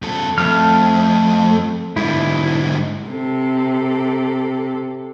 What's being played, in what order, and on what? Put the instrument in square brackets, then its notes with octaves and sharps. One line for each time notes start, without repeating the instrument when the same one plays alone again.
[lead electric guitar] E2 A4
[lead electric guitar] F2 [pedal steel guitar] A3 F6
[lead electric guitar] G#2 D3 [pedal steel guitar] E4
[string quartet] C3 A4